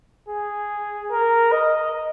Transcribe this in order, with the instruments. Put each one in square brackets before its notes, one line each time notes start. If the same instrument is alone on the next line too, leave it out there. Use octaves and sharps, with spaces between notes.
[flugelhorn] G#4
A#4
D#5